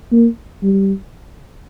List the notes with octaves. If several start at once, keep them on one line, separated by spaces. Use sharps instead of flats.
A#3
G3